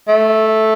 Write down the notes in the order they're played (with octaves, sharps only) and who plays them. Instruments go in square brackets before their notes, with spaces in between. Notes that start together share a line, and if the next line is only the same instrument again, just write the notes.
[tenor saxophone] A3